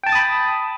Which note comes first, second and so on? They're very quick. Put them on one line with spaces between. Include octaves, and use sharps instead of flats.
G5 A5 A6 D#6 B5